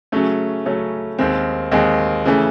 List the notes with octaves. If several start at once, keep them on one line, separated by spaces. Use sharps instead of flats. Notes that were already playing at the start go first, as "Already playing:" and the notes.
C#3 F#3 A3 C#4
C#3 F#3 A3 C#4
D#2 D#3 G#3 C4
D#2 D#3 G#3 C4
C#3 E3 A3